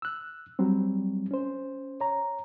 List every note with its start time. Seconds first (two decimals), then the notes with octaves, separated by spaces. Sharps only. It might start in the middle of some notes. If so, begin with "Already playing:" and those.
0.02 E6 F#6
0.59 F#3 G3 C4
1.31 C#4 C5
2.01 C#5 A#5